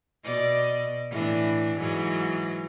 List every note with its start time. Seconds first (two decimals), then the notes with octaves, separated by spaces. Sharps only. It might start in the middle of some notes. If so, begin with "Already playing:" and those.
0.24 B2 D5 D#5
1.10 A2 E3 D4
1.78 G#2 E3 F#3